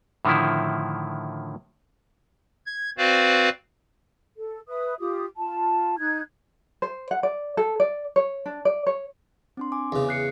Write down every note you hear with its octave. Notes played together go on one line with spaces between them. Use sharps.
A2 D3 D#3 F3 E4
G#6
C4 F#4 B4 C5 D5 F5
A4
B4 E5 D#6
F4 G4 D#6
F4 A5
D#4 F#6 G#6
C5
F#5
D5
A4
D5
C#5
D4
D5
C#5
C4 D4 C6
G#5 D6
E2 C#3
F#6 C7 C#7